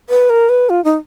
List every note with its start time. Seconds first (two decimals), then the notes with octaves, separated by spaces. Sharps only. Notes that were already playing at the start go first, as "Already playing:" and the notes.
0.10 B4
0.30 A#4
0.49 B4
0.70 F4
0.85 D#4